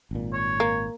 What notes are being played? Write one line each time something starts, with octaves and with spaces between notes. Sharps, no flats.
G#1 A#2
C#5
A#3